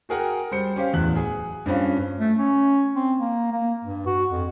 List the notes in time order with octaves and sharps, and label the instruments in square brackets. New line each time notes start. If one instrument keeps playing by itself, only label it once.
[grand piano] F#4 G#4 A#4 F#5 G5
G3 C5 C#7
C#4 G4 C5 F5
D1 E2 F#6
G#4
G2 C4 C#4 F4
[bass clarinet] A3
C#4
C4
A#3
A#3
G2
F#4
F2